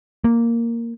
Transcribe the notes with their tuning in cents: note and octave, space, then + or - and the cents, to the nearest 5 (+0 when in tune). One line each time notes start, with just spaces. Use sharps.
A#3 -5